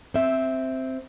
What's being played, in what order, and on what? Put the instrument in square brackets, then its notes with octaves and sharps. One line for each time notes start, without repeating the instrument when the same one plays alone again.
[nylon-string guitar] C4 E5